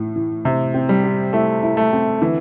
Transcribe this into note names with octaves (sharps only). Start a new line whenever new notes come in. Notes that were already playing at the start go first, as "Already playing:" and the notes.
Already playing: A2 E3
E3
C3 E3
C4
G3
C4
A3 E4
E4
A3
C4
D3 E3